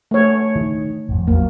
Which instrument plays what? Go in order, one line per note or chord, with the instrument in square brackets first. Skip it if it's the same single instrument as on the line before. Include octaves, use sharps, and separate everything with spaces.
[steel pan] A3 C#5
[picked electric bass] D#3
G#1 F2
[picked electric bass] A1 E2 F#3 [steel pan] A#3